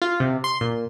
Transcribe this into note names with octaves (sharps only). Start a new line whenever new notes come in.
F4
C3
C6
A#2